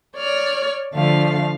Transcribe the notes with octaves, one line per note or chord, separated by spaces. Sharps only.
C#5 D5 F6
D3 F3 A3 F5